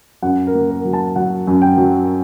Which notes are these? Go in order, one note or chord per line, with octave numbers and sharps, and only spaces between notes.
F#2 F#5
A#4
A#3
A#4
F#3
A5
F#3 F#5
F#2
G5
F#3